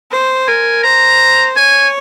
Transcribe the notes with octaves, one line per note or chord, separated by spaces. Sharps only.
C5
A#4 G#5
C5 A#5
C#5 G#5